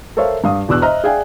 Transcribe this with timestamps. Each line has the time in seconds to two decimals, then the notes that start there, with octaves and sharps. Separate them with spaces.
0.17 A4 A#4 C5 C#5 E5 F5
0.44 G2 F5 D#6
0.68 E2 B2 D4 D6 E6 F#6
0.82 C5 D#5 E5 A#5 F6
1.04 G#4 D5 E5 F5 G5 G#5